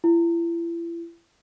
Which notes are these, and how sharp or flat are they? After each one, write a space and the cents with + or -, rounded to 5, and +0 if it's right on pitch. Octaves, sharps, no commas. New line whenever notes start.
E4 +40